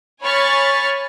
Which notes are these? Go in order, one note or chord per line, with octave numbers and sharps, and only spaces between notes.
C#5 G#5 B5 C#6 F6 A6